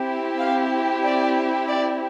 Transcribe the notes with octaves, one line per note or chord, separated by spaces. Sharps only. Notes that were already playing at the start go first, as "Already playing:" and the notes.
Already playing: C4 E4 G4
F5
D5
D5